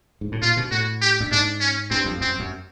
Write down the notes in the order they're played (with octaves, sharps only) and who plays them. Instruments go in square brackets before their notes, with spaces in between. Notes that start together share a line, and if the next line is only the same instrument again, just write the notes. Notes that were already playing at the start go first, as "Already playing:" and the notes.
[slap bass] G#2
A2
[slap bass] A#2 [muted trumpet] F4
[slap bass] B2
[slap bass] A2 [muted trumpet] F#4
[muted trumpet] G4
[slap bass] G2
[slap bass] G#2 [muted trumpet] D4
[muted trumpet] C#4
[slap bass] G2 [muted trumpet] C4
[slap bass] F2
[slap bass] F#2 [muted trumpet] C4
[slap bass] F#2